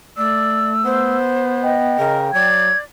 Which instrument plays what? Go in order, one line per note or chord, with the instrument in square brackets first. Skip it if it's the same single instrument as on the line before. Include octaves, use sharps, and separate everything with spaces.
[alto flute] A3 [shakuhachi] D5 [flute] E6
[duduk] B3 [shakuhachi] C5
[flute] D#5 [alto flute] G5
[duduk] C#3 [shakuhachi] A#4
[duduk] F#3 [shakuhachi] D5 [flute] G#6